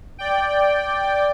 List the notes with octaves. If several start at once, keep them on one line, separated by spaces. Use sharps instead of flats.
D5 G5